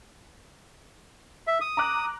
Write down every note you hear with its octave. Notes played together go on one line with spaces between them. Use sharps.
E5
D#6
A#5 D6 F#6